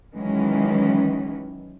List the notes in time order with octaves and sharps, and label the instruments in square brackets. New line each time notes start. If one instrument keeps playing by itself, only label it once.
[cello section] D#3 E3 F#3 G#3 C#4